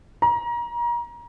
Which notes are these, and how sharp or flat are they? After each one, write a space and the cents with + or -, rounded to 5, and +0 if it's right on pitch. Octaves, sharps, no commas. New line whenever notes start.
A#5 +30